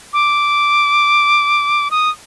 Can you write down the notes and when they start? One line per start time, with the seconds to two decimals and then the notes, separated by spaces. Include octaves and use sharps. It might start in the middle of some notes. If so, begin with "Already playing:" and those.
0.13 D6
1.91 D#6